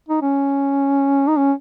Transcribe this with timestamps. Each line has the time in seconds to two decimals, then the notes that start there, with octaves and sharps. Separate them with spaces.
0.09 D#4
0.22 C#4
1.28 D#4
1.37 C#4